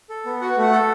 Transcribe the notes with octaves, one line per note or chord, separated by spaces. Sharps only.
A4
B3
F#4 F#5
A3 F#5
A4